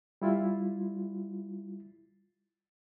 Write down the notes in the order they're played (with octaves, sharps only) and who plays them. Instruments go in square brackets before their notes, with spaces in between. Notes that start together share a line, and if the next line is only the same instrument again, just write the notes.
[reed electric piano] G3 E4 F4